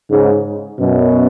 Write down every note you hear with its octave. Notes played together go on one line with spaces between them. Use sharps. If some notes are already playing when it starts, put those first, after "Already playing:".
G#2 C#3
F#2 B2